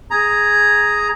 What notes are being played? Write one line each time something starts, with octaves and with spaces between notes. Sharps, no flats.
G#4 A#5